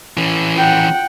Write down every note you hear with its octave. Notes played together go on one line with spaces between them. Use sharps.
E3 C#4
F#5 G5